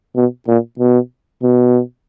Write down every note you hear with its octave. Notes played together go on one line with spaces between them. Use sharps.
B2
A#2
B2
B2